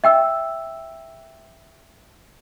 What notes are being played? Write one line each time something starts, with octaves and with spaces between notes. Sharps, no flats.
E5 G5 E6